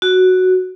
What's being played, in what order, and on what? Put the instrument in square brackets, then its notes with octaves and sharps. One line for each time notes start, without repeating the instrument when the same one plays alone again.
[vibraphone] F#4